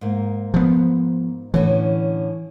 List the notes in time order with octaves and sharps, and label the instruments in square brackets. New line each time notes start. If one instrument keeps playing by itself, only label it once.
[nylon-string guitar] G#2 A#3
[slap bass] F3 B3
[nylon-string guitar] A2 D3 C#4 [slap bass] E3